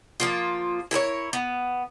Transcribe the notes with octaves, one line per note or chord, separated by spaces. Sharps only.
F3 A#3 F4
E4 A#4 C5 C#5
B3